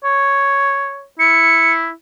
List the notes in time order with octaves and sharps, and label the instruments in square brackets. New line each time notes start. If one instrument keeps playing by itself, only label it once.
[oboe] C#5
[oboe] E4 [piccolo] C#7